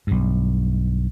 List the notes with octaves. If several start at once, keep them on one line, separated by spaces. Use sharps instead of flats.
B1 G2